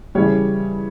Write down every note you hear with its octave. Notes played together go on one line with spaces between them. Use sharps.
C#3 E3 G3 C#5